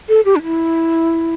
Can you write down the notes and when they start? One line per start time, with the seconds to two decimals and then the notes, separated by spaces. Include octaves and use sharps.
0.09 A4
0.25 G4
0.36 D4
0.43 E4